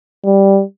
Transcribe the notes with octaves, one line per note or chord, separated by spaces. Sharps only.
G3